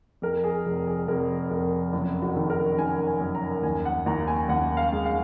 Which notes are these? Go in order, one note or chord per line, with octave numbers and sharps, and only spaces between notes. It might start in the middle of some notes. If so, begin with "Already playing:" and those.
F2 A#4
G#4
F1
G#4
F1 A#4
F1 A#4
F#1
F#4
D#3
A#4
D#3 G#5
G#5
F#2
A#5
D#2 G#5
F#5
D#2 A#5
G#5
D#2 F#5
F5
G#3
F5